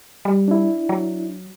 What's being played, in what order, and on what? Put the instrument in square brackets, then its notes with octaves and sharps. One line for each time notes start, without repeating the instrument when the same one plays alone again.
[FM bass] G3
[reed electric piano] D4 E4
[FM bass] F#3